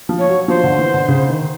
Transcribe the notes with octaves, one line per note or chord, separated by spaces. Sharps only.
F3
C#5
F#3
F3 C5
D3
E3
D3
C#3
D#3